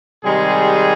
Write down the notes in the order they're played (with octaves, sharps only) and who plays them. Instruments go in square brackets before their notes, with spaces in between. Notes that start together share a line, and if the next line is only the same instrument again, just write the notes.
[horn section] C3 D#3 G3 G#3 G#4